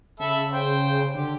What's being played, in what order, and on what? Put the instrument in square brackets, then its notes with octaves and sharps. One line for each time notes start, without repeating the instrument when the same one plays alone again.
[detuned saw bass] C#3 [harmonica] A4 E5 B5
[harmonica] C5 G5
[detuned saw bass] D3 [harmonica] G4